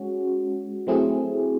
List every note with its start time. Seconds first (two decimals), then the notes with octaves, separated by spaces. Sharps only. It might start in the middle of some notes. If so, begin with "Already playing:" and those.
Already playing: G#3 C#4 F#4
0.87 F#3 A3 C4 E4 G#4